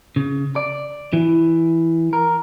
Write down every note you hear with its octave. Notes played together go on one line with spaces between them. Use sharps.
C#3
D5
E3
A#4